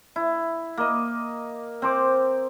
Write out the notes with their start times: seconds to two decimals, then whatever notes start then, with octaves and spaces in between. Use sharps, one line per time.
0.16 E4
0.77 A#3 D#5
1.82 C4 C5 D6